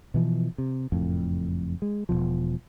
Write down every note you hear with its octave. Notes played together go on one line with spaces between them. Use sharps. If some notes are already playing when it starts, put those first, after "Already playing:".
B2 E3 F3
C3
F#1 F2 A2
G#3
E1 B1 B2 F3